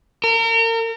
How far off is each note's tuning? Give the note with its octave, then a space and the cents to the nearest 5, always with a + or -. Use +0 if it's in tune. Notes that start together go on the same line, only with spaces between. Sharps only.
A#4 -35